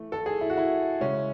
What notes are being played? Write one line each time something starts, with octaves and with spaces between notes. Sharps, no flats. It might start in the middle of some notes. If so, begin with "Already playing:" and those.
Already playing: E3 A3
A4
G#4
E4
F#4
E4
C#3 G#3 C#4